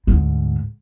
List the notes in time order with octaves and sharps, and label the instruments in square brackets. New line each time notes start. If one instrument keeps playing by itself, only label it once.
[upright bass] D2 G#2